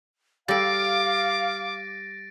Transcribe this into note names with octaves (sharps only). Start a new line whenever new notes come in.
G3 A4 F5 D6 A6 A#6 D7